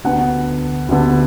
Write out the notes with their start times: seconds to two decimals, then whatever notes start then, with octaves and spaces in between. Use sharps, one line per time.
0.04 D2 D3 B3 F#5
0.88 D2 D3 B3